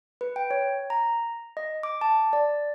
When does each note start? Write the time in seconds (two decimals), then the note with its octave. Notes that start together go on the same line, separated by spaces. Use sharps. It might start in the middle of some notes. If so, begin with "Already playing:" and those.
0.21 B4
0.36 G5
0.51 C#5
0.90 A#5
1.57 D#5
1.83 D6
2.01 A5
2.33 D5